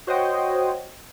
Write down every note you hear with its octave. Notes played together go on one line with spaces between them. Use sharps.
F#4 C5 C#5 D#5 G5